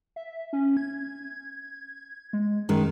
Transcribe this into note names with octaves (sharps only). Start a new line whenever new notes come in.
E5
C#4
G#6
G#3
F#2 D#3 G#3